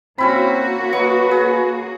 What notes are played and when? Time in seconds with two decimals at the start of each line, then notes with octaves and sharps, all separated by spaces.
0.18 A#3 C4 C#4 E4 F#4 B5
0.93 F#3 B4 D#5 C#6
1.31 G#4